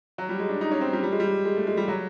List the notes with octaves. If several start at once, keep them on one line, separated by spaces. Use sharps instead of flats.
F#3
G3
G#3
D4
D#4
C#4
C4
G3
G3
G#3
G3
G#3
A3
G#3
G3
F#3